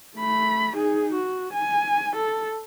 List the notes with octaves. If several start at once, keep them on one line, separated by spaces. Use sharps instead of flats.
A3 B5
D#4 G#4
F#4
G#5
A4